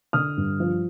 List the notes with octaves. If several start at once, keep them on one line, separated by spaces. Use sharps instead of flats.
D3 D#6 F6
G2
F3